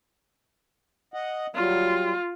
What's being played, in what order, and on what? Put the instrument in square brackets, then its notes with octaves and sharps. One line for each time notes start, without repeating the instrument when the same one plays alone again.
[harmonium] D#5 F#5
[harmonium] F#3 G3 [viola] F4